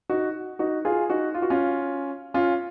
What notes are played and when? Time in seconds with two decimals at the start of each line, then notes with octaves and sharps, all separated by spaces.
0.09 D#4 F#4
0.59 D#4 F#4
0.85 F4 G#4
1.10 D#4 F#4
1.34 F4
1.42 F#4
1.50 C#4 F4
2.34 C#4 F4